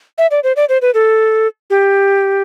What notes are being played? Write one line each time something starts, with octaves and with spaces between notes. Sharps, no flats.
E5
D5
C5
D5
C5
B4
A4
G4